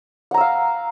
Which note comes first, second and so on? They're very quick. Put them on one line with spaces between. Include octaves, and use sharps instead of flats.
F#5 A#5 E6 F5